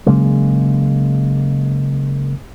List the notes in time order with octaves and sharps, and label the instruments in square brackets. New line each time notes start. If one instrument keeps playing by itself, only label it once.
[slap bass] C#3 F#3 G#3 A#3